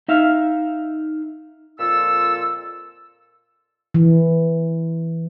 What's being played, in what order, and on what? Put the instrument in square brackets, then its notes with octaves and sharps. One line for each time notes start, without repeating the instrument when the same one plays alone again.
[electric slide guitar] D#4 E5 F5
[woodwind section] F2 A#2 F4 A4 E6
[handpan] E3